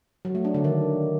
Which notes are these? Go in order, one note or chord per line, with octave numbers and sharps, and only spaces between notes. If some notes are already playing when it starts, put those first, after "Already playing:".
F#3
A3
D4
D3
D#3